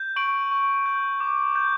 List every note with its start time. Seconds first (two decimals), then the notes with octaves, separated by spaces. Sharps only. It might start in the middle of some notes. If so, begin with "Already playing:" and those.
Already playing: G6
0.16 C#6 D7 F#7
0.51 C#6
0.86 G6
1.20 D6
1.55 G6